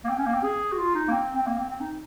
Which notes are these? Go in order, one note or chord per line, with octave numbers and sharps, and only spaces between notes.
A#3
C4
C#4
A#3
C4
G#4
F#4
F4
D#4
A#3
C4
C4
A#3
C4
C4
D#4